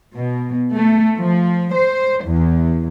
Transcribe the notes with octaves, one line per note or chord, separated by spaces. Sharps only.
B2
A3
F3
C5
E2